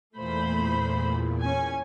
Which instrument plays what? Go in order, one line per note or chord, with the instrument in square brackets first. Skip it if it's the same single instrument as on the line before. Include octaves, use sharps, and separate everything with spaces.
[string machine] E2 A#2 [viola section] A3 C5 B5
[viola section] C#4 G#5